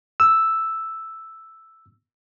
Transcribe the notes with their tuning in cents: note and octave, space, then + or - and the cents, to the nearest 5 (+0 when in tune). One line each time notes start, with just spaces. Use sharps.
E6 +0